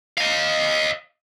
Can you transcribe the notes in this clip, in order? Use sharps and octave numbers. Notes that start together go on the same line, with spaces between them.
D#5 F5